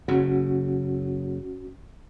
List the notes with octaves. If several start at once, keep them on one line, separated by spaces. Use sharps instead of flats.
F#1 C#3 F#3 C#4 F#4